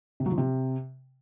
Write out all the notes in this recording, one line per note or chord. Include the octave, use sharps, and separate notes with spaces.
C3
F#3
F3
C3